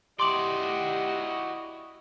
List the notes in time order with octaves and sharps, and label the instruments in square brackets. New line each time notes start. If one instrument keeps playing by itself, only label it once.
[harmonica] E4 D#5 [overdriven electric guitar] F#4 D5 [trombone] G4 [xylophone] C6 D6 F#7